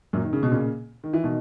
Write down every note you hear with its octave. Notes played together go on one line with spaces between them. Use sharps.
F#2 A#2
D#3
C#3
B2
A#2 C#3
D#3
E3
B2 D#3